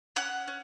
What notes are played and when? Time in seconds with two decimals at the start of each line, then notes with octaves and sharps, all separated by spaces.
0.16 C#4 F#5 F#6
0.48 C#4